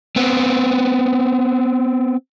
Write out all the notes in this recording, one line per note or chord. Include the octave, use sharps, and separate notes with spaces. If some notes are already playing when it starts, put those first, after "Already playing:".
B3 C4